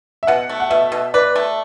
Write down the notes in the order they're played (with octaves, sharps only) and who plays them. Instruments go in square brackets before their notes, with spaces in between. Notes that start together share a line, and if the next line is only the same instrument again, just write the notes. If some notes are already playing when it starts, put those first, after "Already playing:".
[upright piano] E5
[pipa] B2 [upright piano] F#5
[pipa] A3
[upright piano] F#5
[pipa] B2 [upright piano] E5
[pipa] B2
[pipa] B4 [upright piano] D5
[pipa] A3